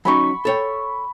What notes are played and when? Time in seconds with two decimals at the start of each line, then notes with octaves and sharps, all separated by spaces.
0.05 F#3 C#4 D#4 B5 C#6
0.45 A4 C#5 G5